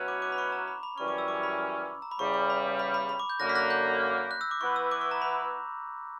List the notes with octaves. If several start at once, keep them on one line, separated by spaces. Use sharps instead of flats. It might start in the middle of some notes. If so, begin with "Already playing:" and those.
Already playing: B2 F#3 C#4 E4 B4
D6
D6
B5
C#6
A#5
B5
B5
F#2 E3 G3 C#4 C#6
D6
E6
D6
B5
A#5
B5
E2 C#3 G3 C#6
C#6
B5
B5
B5
B5
D6
G6
F#2 D3 A#3 F#6 A#6
B6
F#6 A#6
G6
F#6
E6
D6
E3 B3 E4 B4 C#6
E6
D6
C#6
A#5
B5